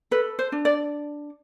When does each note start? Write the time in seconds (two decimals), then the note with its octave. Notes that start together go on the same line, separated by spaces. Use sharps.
0.11 A4 B4
0.39 C5
0.52 D4
0.65 D5